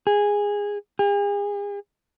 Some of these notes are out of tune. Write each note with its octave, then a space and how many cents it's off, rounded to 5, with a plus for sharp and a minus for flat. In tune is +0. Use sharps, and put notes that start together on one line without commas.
G#4 -15
G#4 -40